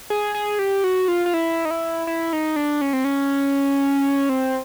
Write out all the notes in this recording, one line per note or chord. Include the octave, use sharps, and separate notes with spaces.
G#4
G#4
G4
F#4
F4
F4
E4
D#4
E4
E4
D#4
D4
C#4
C4
C#4
C4